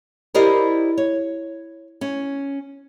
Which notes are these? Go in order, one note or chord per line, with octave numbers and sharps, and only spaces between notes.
E4 G4 A#4 C5 D5 D#5
C#5
C#4